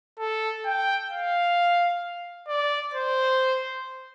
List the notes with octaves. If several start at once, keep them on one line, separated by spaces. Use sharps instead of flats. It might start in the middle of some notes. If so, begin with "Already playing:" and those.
A4
G5
F5
D5
C5